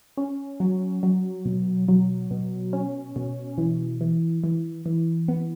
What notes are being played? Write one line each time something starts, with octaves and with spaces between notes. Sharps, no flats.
C#4
F#3
F#3
B2
F#3
B2
C#4
B2
E3
E3
E3
E3
B3